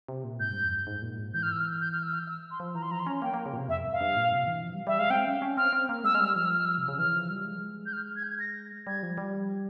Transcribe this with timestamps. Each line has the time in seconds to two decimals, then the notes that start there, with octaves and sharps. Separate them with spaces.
0.08 C3
0.24 A#2
0.40 G#2 G6
0.51 G2
0.63 F2
0.76 G2
0.87 G#2
1.02 A#2
1.18 G#2
1.34 E3 G6
1.43 F6
1.52 E6
1.61 F6
1.81 G6
1.92 F6
2.03 E6
2.14 F6
2.28 E6
2.51 C6
2.60 F3
2.75 E3 A#5
2.83 C6
2.91 F3 A#5
2.99 C6
3.06 C#4 A#5
3.22 A#3 G5
3.34 A#3
3.46 C#3
3.53 A#2
3.57 C3
3.69 F2 E5
3.85 G2
3.93 F5
4.01 G2
4.16 A#2
4.33 C3
4.47 E3
4.63 F3
4.75 G3
4.87 G3 E5
4.99 G#3 F5
5.10 C4 G5
5.26 C#4
5.42 C#4
5.57 C4 F6
5.72 C4
5.89 A#3
6.04 G#3 E6
6.15 G#3 F6
6.20 G3 E6
6.35 F3 F6
6.45 E6
6.55 F6
6.65 E6
6.78 C3
6.88 C#3
6.98 E3 F6
7.14 F3
7.30 G3
7.45 G#3
7.86 G6
7.93 F6
8.16 G#6
8.23 G6
8.30 G#6
8.40 A#6
8.87 G3 G#6
9.03 F3
9.18 G3